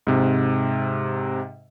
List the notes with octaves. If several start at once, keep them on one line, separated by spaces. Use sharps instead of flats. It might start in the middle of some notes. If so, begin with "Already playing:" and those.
G#2 C3